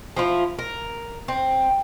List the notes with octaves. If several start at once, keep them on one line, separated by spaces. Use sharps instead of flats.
F3 E4 F4
A#4
C4